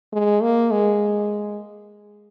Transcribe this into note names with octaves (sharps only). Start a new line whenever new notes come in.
G#3
A#3
G#3